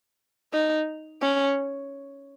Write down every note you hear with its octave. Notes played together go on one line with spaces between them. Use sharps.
D#4
C#4